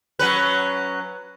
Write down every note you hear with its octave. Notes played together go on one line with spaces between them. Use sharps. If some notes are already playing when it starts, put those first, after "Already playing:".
F#3 C#4 B4